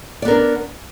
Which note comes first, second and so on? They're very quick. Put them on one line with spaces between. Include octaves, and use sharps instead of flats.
D5 B3 A#4 D4